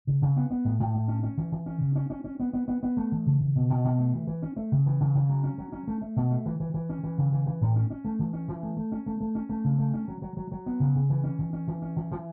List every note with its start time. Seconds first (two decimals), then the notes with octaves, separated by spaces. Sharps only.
0.07 C#3
0.22 C#3
0.37 B3
0.50 B3
0.65 A2
0.80 A2
0.94 A2
1.08 C#4
1.23 C#4
1.37 E3
1.52 E3
1.66 C#4
1.81 C#3
1.95 C#4
2.10 C#4
2.24 C#4
2.40 B3
2.53 B3
2.68 B3
2.83 B3
2.97 A3
3.12 E3
3.26 C#3
3.40 C#3
3.55 B2
3.70 B2
3.84 B2
3.99 A3
4.14 E3
4.27 E3
4.42 C#4
4.56 A3
4.72 C#3
4.86 E3
5.00 C#3
5.15 C#3
5.29 F#3
5.44 C#4
5.58 F#3
5.72 C#4
5.88 A3
6.02 A3
6.16 B2
6.31 A3
6.46 E3
6.60 E3
6.74 E3
6.89 C#4
7.03 E3
7.18 C#3
7.33 E3
7.46 E3
7.61 A2
7.76 C#4
7.90 C#4
8.05 A3
8.19 E3
8.33 C#4
8.48 E3
8.63 A3
8.77 A3
8.92 C#4
9.06 A3
9.20 A3
9.35 C#4
9.50 A3
9.64 C#3
9.79 A3
9.94 C#4
10.08 F#3
10.22 F#3
10.37 F#3
10.52 F#3
10.66 B3
10.80 C#3
10.95 C#3
11.10 E3
11.24 C#4
11.39 E3
11.53 C#4
11.67 E3
11.82 C#4
11.96 E3
12.11 E3